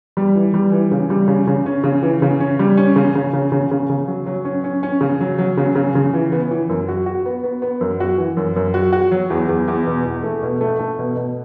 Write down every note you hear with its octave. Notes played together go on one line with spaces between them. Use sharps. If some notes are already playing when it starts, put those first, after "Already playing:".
G3
E3
G3
E3
C#3
G3
C#3
C#3
C#4
C#3
E3
C#3
C#4
G3
C#4
C#3
C#3
C#3
C#3
C#3
C#3
F#3
F#3
C#4
C#4
C#4
C#3
F#3
F#3
C#3
C#3
C#3
E3
B3
E3
F#2
F#4
F#4
B3
B3
B3
F#2
F#4
E3
F#2
F#2
F#4
F#4
F#3
E2
E2
E2
B2
E2
A3
B2
A3
A3
B2
B2